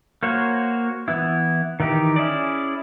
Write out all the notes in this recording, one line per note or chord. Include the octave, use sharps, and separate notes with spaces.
A#3 F#4 C5 C#5
E3 B3 E4
D#3 E3 D#4 G4
C#4 E4 G#4 D5